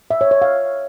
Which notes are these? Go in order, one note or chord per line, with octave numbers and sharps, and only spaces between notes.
E5
C#5
C#5
F5